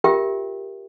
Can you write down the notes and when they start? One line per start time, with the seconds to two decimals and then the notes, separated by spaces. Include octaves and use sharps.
0.04 F4 G4 A#4 E5 G5